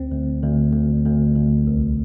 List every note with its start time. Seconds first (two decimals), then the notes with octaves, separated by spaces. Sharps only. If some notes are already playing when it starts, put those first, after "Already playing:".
Already playing: D2 C4
0.11 D2
0.43 D2
0.74 D2
1.05 D2
1.36 D2
1.67 C2